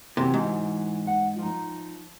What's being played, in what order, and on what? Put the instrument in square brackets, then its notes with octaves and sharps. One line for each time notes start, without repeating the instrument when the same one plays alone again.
[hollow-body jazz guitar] C3 [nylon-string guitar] E3 F#3
[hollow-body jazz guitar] G#2
[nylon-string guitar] F#5
F3 D#4